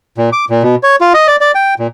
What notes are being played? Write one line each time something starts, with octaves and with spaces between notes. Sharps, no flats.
A#2
D6
A#2
B2
C#5
F4
D#5
D5
D5
G5
A#2